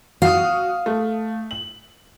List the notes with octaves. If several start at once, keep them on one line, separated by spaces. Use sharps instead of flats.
F#4 F5 D#6
A3
F#7